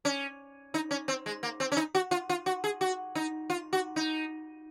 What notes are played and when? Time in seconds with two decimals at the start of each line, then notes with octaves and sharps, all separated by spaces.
0.05 C#4
0.74 D#4
0.91 C#4
1.08 C4
1.26 G#3
1.43 A#3
1.60 C4
1.72 C#4
1.77 D#4
1.95 F#4
2.11 F4
2.29 F4
2.46 F#4
2.64 G#4
2.81 F#4
3.15 D#4
3.50 F4
3.73 F#4
3.96 D#4